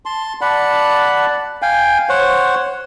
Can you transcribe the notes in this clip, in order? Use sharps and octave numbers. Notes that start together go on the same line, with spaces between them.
A5 C6
D5 F#5 A5 B5
F5 G5 G#5
C5 C#5 F#5